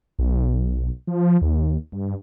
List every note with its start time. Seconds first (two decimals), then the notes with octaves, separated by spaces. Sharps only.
0.19 B1
1.07 F3
1.42 D#2
1.92 G2